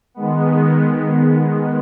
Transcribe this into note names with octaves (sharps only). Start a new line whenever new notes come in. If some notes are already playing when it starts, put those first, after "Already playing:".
D#3 G#3 B3